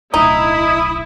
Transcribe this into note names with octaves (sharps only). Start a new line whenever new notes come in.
D1 B1 D#4 E4 D#6